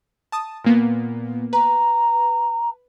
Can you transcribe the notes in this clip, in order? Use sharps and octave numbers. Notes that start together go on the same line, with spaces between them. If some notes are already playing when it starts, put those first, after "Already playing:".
A5 D#6
A#2 A#3 B3
B4 A#5